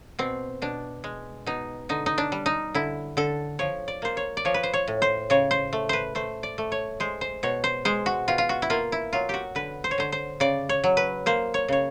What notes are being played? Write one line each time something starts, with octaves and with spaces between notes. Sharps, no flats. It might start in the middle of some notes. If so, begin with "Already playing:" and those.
B2 C4
B2 D4
G#3
B2 D#4
D3 D#4
D#4
D4
G3
D#4
D3 E4
D3 A4
F3 C#5
D5
A#3 C5
C#5
D5
F3 C#5
B4
C5
C#5
A2
C5
C#3 C#5
C5
A3
B4 C5
A3 C5
D5
A3
C#5
G#3 C5
C5
B2 C#5
C5
G#3 C5
F#4
B2 F4
F4
F#4
E4
A#3 F4
E4
F#3 F4
F#4 G4
D3 B4
C5
C#5
D3 C5
C5
C#3 D5
C#5
F#3
B4
A#3 C5
C#5
C#3 C#5